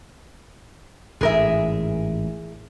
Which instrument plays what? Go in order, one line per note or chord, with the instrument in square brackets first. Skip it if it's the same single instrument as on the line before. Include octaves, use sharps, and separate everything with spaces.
[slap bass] A1 G#2 [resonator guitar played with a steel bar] G#4 A#4 E5